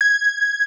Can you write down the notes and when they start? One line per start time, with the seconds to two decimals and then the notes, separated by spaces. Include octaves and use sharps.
0.01 G#6